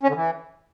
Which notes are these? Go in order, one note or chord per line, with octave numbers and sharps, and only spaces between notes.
C#4
D3
E3